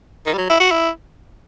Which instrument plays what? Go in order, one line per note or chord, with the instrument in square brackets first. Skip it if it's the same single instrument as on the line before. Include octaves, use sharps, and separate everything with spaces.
[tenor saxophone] D#3
G3
F#3
E4
F#4
E4